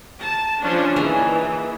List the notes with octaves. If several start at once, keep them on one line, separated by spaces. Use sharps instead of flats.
A5 A#5
F3 C#4 D4
E3 A#3 D#4 G#4